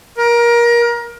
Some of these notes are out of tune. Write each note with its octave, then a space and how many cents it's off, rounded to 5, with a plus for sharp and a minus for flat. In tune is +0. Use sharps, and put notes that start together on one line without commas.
A#4 +25